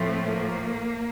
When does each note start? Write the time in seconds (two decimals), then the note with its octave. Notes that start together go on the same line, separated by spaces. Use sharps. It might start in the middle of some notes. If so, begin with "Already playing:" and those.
Already playing: A2 F3 A3 C4
0.29 A#3